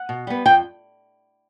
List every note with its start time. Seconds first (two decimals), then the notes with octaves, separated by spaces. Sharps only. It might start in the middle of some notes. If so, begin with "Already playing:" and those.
Already playing: F#5
0.09 B2
0.27 G3 B3
0.46 F2 G5